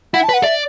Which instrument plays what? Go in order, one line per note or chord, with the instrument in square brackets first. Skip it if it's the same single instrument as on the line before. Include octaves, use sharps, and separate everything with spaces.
[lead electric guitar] E4 [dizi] F#5
[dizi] A5
[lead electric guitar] B4
[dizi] F#5
[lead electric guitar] D5 [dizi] E5